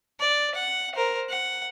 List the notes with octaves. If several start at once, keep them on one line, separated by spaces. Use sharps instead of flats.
D5
F#5
A#4 C5
F#5